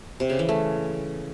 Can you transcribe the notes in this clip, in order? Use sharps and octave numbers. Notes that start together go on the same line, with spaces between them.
C3
C#3
E3
A3